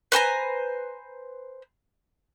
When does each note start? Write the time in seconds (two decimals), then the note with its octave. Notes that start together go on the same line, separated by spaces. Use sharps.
0.12 B4 C5 G#5 A#5